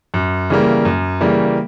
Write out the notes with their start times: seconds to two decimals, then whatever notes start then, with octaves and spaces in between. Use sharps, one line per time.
0.14 F#2
0.50 C#3 E3 G3 A#3
0.85 F#2
1.21 C#3 E3 G3 A#3